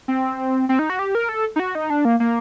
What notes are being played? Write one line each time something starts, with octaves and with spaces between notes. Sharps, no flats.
C4
C4
D#4
F#4
G4
A#4
A4
D#4
F#4
D#4
D4
A#3
A#3